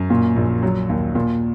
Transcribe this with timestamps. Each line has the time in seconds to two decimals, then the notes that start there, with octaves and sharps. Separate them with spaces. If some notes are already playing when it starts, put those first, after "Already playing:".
Already playing: F#2
0.10 A#2
0.36 A#1
0.63 F#3
0.89 D#2
1.15 A#2